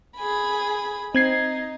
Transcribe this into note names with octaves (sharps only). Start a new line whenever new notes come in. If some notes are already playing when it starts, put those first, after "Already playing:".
G#4 B5
C4 D#4 G#6 C7